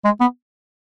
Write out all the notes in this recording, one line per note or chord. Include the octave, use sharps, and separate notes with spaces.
G#3
B3